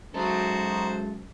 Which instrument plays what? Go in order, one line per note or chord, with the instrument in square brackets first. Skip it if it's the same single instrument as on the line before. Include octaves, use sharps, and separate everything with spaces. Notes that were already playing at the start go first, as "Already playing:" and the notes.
[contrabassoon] F#2 [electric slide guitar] G#3 A4 [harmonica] D#4 F#4 C5